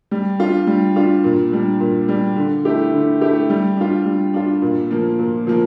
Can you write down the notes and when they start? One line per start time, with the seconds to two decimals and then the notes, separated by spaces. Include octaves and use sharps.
0.11 G3
0.39 D4 F4
0.67 G3
0.96 D4 F4
1.24 A#2
1.53 G3 D4
1.80 A#2
2.08 G3 D4
2.36 D3
2.65 A3 E4 G4
2.93 D3
3.21 A3 E4 G4
3.50 G3
3.77 D4 F4
4.06 G3
4.34 D4 F4
4.62 A#2
4.91 F3 A#3
5.19 A#2
5.47 F3 A#3